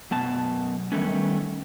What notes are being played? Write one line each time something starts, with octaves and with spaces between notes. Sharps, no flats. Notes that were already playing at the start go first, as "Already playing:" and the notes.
F#2 B2 A5
D#3 G3 A3 B3 C#4